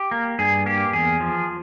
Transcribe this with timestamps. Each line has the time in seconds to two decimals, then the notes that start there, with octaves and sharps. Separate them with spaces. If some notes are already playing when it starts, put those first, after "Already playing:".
Already playing: G4
0.11 A#3
0.39 G2 G#4
0.66 A#3 G4
0.93 E2 G#4
1.20 F3